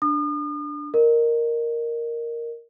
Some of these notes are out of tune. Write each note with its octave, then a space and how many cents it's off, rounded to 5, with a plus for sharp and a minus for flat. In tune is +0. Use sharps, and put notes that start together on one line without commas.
D4 +0 D#6 -40
A#4 +0 D#5 -25